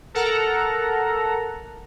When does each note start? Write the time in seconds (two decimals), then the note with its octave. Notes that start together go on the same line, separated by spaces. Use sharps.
0.14 A4 A#4 F#5 A#5